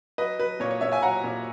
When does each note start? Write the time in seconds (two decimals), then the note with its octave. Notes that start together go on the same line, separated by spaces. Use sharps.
0.18 F#3 B4 D#5
0.39 F#3 B4
0.60 A#2 C#5
0.71 C#5
0.81 A#2 C#5 E5
0.92 E5 G#5
1.02 F#3 F#5 A#5
1.24 A#2